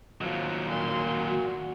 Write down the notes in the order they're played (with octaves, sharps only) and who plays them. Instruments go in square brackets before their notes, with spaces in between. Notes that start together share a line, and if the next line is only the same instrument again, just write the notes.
[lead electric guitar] D#2 F#3 [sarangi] F3
[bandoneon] A#2 [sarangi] C6
[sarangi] F#4